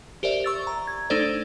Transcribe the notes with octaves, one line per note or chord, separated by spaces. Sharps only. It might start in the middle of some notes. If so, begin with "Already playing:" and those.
G4 A#4 C5 D5 E5
C#6 E6 A6
A#5
G#6
A3 D4 D#4 A4 C5 D5